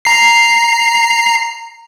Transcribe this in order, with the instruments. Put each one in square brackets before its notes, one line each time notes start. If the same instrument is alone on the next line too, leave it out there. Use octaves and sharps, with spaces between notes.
[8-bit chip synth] A#5 C7